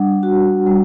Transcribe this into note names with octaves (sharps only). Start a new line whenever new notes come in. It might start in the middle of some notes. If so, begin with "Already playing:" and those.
Already playing: G3 D4 F#5
F#4
G3